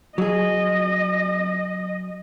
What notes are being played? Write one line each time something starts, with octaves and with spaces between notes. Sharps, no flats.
F#3 G#4 D#5